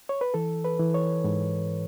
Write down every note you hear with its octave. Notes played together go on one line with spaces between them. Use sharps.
C#5
B4
E3 A4
B4
E3
C#5
G#2